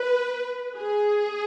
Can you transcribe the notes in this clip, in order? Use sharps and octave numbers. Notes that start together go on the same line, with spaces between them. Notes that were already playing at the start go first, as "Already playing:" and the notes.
Already playing: B4
G#4